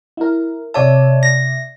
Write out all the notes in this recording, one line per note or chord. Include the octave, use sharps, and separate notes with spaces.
E4 A#4
C3 C#5 D5 E5 A5
A#6